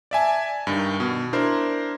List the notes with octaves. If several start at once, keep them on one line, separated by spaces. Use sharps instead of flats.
D5 E5 G#5 A5
G2 D#3
B2
D4 E4 A#4 C5